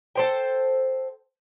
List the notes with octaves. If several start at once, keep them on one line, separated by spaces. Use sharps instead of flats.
A4 C5 G5